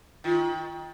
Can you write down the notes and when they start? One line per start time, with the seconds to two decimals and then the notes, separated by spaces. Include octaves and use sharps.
0.24 D#3 F4